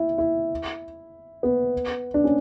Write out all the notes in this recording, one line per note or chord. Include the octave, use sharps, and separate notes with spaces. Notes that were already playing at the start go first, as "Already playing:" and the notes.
Already playing: E4
E4
B3
D4
C#4